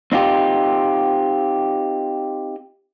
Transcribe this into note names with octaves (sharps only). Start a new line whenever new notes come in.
C4 D#4 F4 G4